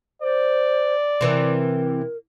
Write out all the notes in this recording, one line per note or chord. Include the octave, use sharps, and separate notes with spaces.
C5 D5
C3 E3 A#4